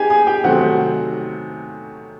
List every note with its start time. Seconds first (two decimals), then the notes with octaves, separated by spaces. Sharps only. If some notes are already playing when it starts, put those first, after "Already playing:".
Already playing: D#4 G4 G#4 G5 G#5
0.10 G#4 G#5
0.27 G4 G5
0.44 C3 D#3 F#3 A3 C4 F#4 F#5